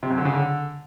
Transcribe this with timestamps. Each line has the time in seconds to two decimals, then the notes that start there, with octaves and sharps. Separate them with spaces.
0.03 C3
0.10 F#2
0.18 D3
0.25 C#3
0.33 D3